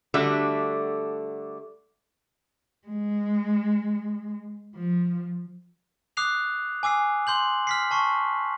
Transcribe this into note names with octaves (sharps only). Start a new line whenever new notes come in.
D3 G3 A3 D4 F#4 A4
G#3
F3
D6 D#6 F#6 C7 F7
G#5 D6 E6 C7
C6 G6 F#7
F6 B6 C7
A5 C#6 C7